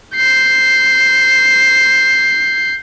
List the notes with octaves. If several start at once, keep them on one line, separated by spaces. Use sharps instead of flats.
G6 C7